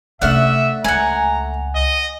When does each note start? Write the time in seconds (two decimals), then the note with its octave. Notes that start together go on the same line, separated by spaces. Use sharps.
0.22 C3 A3 C#4 D4 E5 F#5 F6
0.84 C#2 F#5 G#5 A#5
1.75 D#5